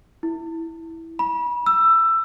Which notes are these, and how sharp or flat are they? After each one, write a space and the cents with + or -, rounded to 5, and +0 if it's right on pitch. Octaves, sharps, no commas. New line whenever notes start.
E4 -5
B5 -35
E6 +15